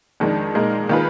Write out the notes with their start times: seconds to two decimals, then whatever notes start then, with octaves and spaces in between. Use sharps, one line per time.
0.20 F2 D#3 G#3 D4
0.55 A#2 G#3 D#4 A#4
0.89 D#3 A#3 F4 G#4 B4